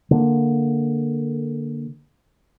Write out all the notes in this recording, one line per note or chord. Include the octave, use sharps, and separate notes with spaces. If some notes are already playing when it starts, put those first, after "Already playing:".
D3 A#3